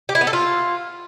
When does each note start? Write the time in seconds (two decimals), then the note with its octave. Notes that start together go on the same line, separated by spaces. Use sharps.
0.09 G4
0.15 E4
0.21 B3
0.27 A4
0.33 F4